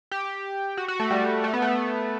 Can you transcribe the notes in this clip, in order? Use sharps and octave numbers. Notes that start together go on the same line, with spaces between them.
G4
F#4
F#4
A3
G3
A3
B3
A3